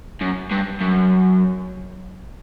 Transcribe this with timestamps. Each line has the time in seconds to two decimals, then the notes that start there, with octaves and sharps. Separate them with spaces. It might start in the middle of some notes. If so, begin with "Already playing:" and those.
0.21 F#2
0.51 G2
0.80 F#2